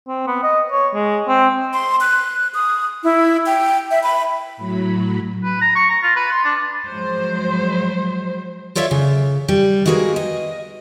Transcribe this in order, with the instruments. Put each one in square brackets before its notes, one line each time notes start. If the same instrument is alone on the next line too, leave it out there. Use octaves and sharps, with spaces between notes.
[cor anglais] C4
B3
D#5
C#5
G#3
C4
[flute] C6
F#6
D#6
E4
G5
E5
B5
[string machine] A2 F#3 B5
[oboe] B4
A#5
C#6
A#5
F4
B4
C6
D4
[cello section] F3 F#3 G#3 C5
[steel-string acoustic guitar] F4 A4 C#5 D5 E5 F5
C#3
G3
G#3 A#3 F#4 G#4 A#4 B4
D#5